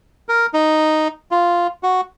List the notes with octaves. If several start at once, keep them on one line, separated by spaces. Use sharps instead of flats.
A#4
D#4
F4
F#4